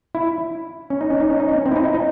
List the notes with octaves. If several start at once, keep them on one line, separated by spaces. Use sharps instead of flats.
E4
C#4
D#4
C#4
D#4
C#4
D#4
C#4
C4
E4
D#4
E4
D#4